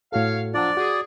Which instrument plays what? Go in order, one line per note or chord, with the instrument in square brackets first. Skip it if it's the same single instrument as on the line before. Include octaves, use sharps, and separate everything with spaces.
[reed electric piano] A2 F#4 A4 [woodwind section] C#5 F5
[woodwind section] F3 F#3 D4 [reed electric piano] F4 F#5 [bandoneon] D5
[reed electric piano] F#4 [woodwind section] G#4